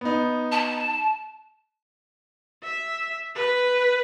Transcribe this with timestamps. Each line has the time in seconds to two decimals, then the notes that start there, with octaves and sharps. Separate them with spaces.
0.01 B3 D#4
0.52 A5
2.63 E5
3.35 B4